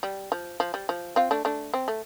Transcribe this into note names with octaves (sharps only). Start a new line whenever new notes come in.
G3
F3
F3
G3
F3
C4 F4
A3 D4
A3 D4
C4
A3